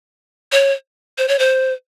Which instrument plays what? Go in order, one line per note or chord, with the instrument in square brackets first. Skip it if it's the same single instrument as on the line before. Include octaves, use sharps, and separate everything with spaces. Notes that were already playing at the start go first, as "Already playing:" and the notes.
[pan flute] C#5
C5
C#5
C5